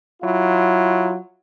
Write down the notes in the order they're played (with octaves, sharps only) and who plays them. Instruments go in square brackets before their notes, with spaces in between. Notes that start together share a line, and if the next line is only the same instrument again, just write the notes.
[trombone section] F#3 E4 F4